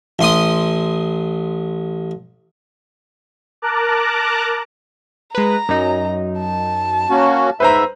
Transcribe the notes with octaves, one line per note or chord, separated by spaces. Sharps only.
A1 C6 D#6
A#4 A5 A#5 D6 F#6
G#3 B4 A#5
F#2 F#3 D#4
A5
A#3 C#4 F#4
G#2 B4 C5 E5 A#5